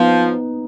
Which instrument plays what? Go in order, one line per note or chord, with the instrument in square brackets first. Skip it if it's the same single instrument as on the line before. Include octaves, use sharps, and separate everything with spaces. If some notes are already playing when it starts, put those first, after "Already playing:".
Already playing: [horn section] F3 [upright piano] B3 D#4